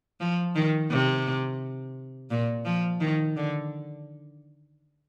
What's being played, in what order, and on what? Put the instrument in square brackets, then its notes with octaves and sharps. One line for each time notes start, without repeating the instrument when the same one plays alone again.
[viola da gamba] F3
D#3
C3
A#2
F3
D#3
D3